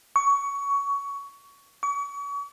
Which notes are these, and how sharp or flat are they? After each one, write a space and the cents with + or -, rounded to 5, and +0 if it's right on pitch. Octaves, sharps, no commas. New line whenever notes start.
C#6 +20
C#6 +40